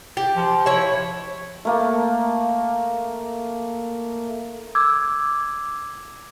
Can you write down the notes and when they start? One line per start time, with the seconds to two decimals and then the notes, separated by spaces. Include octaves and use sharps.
0.17 G4
0.36 F3
0.66 E4 C#5
1.65 A3 A#3
4.75 D6 E6 G#6